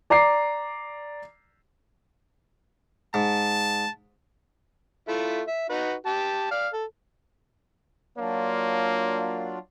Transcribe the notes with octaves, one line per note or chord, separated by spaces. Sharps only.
D5 A#5 D6 C7
G#2 A5
A3 E4 F4
E5
D#4 F#4 B4
G4 A5
D5 F5
A4
F#3 A#3 D4 F4 C#5